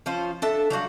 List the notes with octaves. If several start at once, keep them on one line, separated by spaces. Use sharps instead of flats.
F3 C#4 F4 C5
D4 A4 E5 A5
F#3 G3 F#4 F5